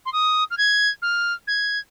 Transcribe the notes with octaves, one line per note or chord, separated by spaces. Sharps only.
C6
D#6
F6
G#6
F6
G#6